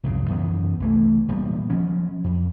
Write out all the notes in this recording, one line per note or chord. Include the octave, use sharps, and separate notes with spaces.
C2 F2 G#2 C#3
F#2 E3 B3
C2 E3 A3
E1 A#2 G3 B3
F3 F#3 C#4
F2